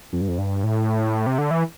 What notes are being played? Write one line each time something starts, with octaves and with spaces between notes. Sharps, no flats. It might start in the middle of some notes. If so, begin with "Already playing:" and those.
F2
G2
F2
G2
A2
C3
D3
E3